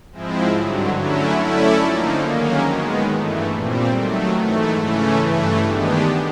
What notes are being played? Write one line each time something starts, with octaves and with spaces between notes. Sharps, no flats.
G#2 F3 G#3 C4 E4
G2 D3 F#3
D3 F#3 A3 C#4 E4
A3 C#4 E4 A4 D5
D3 F3 A#3 D#4
G#2 D#3 F#3 A#3 C#4
D#3 G#3 B3
G2 E3 A3
A#2 G3 C4
D#3 F#3 A3
G#2 E3 A3
C#3 E3 A3 C#4
G2 E3 A3
D#3 G#3 B3 D4 G4